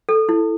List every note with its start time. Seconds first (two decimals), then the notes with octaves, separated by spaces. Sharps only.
0.09 A4
0.29 E4